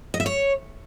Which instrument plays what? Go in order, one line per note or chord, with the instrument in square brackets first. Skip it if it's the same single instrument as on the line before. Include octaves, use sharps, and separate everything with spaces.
[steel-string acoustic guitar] D#5
E5
C#5